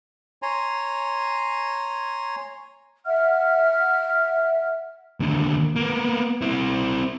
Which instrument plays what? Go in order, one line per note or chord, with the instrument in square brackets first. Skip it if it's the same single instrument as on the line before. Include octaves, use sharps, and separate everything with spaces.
[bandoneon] C#5 G#5 A#5 C6
[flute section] E5 F#5 F6
[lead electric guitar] D#2 D3
A#3 B3
C4 E4